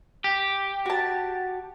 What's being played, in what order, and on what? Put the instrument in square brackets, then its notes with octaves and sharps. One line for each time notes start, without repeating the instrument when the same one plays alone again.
[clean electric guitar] G4
[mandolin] F#4 A5